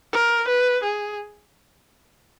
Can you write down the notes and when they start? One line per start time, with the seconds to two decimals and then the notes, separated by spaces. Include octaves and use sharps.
0.13 A#4
0.48 B4
0.83 G#4